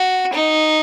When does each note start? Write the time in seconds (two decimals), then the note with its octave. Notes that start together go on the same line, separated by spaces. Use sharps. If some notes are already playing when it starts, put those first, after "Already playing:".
Already playing: F#4
0.33 D#4